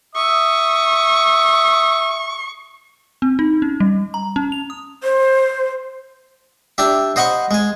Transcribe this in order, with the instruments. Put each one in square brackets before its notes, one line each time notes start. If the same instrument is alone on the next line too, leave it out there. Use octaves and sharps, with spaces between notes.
[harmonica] E5 D#6 [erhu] C#6
[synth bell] C4
D#4
C#4
G3
A#5
C#4
F7
D#6
[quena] C5
[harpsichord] D4 G4 E5
C5 D#5 F#5 B5 C#6
G#3 G#5